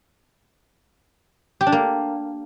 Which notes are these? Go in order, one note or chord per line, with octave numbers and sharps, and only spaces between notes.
G4
D4
A#3